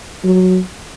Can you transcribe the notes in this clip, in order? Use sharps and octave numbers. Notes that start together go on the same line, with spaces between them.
F#3